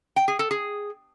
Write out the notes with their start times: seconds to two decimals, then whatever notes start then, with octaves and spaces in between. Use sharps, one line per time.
0.16 G5
0.28 G#4
0.39 A4
0.51 G#4